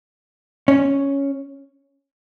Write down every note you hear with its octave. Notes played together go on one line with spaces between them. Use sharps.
C#4